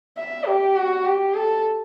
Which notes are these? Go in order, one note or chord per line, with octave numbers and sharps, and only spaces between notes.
E5
G4
F#4
G4
A4